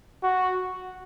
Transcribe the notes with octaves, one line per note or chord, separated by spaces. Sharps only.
F#4